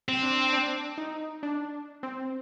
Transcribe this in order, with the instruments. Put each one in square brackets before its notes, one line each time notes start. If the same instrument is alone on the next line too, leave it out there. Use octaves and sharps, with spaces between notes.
[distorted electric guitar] C4
[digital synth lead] D4
D4
D#4
D4
C4